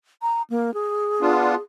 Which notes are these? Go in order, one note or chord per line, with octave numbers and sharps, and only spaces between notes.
A#5
A#3
G#4
B3 D4 F4